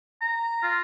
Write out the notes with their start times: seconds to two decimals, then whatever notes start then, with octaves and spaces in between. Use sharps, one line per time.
0.21 A#5
0.63 F4